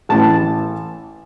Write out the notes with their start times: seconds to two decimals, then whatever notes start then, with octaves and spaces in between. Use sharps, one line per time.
0.09 A1 A2 E3 A5